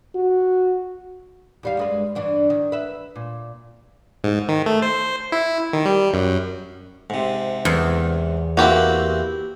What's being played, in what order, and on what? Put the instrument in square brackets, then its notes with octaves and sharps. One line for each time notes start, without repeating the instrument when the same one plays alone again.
[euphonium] F#4
[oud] D#2 G3 F5
G2 G#3 B4
G2 E3 D4
D#3
B4 E5
A#2
[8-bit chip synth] G#2
D#3
A3
C5
E4
D#3
G3
F#2
[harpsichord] G#2 C3
[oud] E2
[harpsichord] A#3 C4 E4 [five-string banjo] F#4 G4 B4